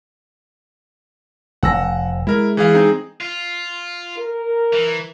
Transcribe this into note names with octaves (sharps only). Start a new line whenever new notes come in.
F1 F#5 E6 A#6
G#3 E4 A#4
E3 G#4 F5
C4 D#4 G#4
F4
A#4
E3